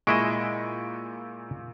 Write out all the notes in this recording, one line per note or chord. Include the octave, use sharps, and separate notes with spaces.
A#2 G#3 E4 D#5 C#6 D7